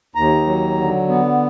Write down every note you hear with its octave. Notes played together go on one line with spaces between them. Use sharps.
D#2 A#5
F#3
D3
B3